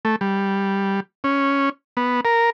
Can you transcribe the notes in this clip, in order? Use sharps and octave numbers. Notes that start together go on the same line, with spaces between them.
A3
G3
C#4
B3
A#4